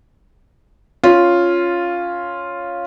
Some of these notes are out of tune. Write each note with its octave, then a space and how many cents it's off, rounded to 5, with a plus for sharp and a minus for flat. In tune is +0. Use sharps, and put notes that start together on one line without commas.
C#4 +0 F4 +0